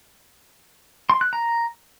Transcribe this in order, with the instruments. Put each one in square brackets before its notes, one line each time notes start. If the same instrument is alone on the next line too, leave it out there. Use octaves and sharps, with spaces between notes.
[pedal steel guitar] C6
F#6
A#5